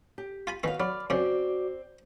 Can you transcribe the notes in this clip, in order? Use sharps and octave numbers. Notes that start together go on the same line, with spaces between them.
G4
F4 G#5 B5
D#3 E3 B3 E4 F#4 F5
F#3 D5 B5 F6
F#2 C#3 C4 F#4 D5 D6